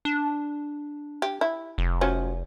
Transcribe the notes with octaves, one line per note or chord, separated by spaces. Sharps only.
D4
G4
E4
F1
F3 F#3 C#4